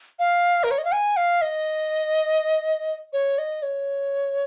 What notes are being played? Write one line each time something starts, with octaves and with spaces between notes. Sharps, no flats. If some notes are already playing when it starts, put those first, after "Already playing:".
F5
A#4
C#5
D#5
F5
G#5
F5
D#5
C#5
D#5
C#5